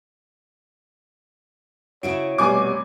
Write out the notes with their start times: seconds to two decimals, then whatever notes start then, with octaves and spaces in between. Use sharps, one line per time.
2.03 C#3 E4 F#4 C#5 D7
2.38 F1 B2 G3 G#5 D6